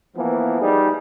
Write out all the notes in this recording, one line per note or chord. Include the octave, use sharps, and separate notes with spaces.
E3 F3 A#3 B3
G3 D#4 G#4